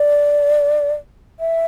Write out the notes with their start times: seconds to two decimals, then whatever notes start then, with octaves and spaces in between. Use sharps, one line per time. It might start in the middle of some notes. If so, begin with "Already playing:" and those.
Already playing: D5
1.40 E5